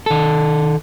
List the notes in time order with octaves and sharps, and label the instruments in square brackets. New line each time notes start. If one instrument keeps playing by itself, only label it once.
[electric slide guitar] D#3 A4